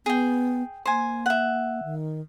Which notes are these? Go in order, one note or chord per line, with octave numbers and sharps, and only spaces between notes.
B3 G#4 G5
A#3 C5 G#5
E5 F#5
D#3